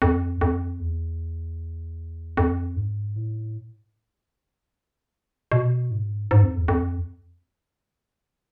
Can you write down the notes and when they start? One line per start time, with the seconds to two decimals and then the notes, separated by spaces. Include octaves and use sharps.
0.02 F2
0.41 F2
0.80 E2
2.37 F2
2.76 G#2
3.16 A2
5.52 B2
5.91 G#2
6.31 G#2
6.43 F2
6.56 E2
6.68 F2